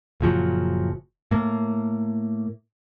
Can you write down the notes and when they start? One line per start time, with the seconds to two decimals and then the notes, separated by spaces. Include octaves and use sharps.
0.21 F#1 A#2 F3 F#3
1.31 A2 A#3